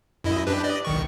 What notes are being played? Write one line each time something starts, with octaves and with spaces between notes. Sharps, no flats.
F#2 E4 D#5
D4 G4 B4
D5 D#5
B1 D#3 C#6